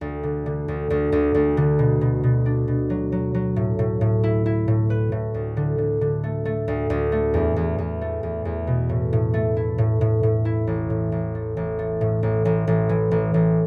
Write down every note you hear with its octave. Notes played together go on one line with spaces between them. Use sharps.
D2
D3
D3
D2
D2
D2
D2
D3
B2
B2
B2
D4
B2
F#3
F#3
F#3
A2
A2
A2
E4
E4
A2
B4
A2
D2
D3
D3
D3
A3
A3
D2
D2
A3
E2
E2
E2
A3
E2
E2
B2
A2
A2
A3
E4
A2
A2
A2
E4
A1
A2
A1
A3
A1
A3
A2
A1
A1
A1
E3
A1
A1